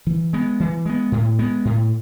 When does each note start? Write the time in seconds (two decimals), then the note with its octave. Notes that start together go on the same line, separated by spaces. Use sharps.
0.07 E3
0.33 G#3 B3
0.60 E3
0.86 G#3 B3
1.12 A2
1.39 G#3 B3
1.65 A2